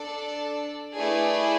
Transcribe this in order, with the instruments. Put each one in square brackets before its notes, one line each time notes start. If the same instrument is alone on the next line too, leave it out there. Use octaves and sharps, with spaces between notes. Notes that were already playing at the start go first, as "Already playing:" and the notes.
Already playing: [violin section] D4 A4 D5
A3 E4 G#4 B4 D5